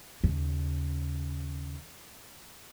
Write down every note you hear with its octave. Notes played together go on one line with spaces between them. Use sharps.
D#2 C#3